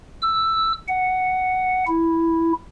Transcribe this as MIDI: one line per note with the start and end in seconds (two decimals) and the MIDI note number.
0.22 0.72 88
0.88 1.84 78
1.88 2.53 64